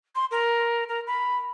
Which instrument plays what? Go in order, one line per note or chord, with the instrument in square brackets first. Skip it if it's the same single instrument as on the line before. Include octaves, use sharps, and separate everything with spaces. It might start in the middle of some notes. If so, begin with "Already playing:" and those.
[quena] C6
A#4
A#4
B5